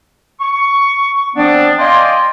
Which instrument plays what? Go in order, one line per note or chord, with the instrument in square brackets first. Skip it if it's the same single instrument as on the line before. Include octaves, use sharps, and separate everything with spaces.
[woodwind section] C#6
F3 B3 C4 D4
D5 D#5 F5 G5 G#5 C6